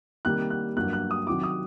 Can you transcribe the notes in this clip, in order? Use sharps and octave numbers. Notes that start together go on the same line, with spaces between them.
C3 D#3 G3 A#3 F#6
F#6
G2 F#3 A#3 F#6
F#6
D#6
C3 D#3 F#3 D6
D#6